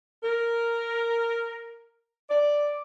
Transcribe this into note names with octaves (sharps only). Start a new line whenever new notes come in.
A#4
D5